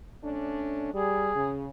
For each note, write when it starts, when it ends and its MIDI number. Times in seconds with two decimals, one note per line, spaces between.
0.24 0.92 57
0.24 0.92 61
0.24 0.92 62
0.94 1.30 55
0.94 1.52 68
1.35 1.68 49